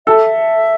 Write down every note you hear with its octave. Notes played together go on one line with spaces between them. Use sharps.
A4 E5